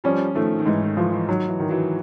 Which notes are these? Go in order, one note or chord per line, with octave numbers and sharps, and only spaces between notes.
F3 G3 C#4
D#3 F3 A3
D#3
G#2 E3
D#3
E3 F3
E3
D#3 F#3
E3
D#3
E3 F#3